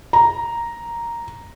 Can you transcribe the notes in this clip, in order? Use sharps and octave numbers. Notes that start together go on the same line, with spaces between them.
A#5